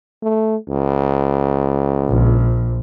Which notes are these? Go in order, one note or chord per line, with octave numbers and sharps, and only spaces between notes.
A3
C#2
A#1